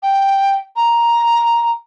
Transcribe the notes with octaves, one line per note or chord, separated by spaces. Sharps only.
G5
A#5